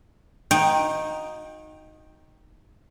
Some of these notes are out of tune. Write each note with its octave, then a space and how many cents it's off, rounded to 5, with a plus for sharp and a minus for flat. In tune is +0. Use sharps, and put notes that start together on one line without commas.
D#4 +0 F#4 -35 G5 +5